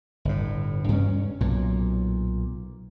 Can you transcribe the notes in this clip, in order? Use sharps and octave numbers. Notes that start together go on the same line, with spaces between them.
G1 A2
G2 C#4
B1 A#2